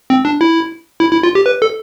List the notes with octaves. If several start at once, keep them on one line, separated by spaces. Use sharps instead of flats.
C4
D4
E4
E4
E4
F4
G4
B4
A4